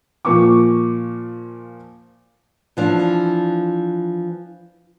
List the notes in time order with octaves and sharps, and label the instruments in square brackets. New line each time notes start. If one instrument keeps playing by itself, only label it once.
[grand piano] A#2 F3 C#6 D6
[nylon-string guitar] E3 F3 D4